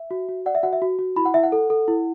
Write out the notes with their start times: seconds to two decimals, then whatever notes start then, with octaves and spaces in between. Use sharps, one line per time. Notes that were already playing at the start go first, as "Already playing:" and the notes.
Already playing: E5
0.11 F#4
0.29 F#4
0.46 D5 F#5
0.55 E5
0.63 F#4 F#5
0.73 E5
0.82 F#4
0.99 F#4
1.16 E4 B5
1.25 F#5
1.34 E4 E5
1.43 F#5
1.52 A4
1.70 A4
1.88 E4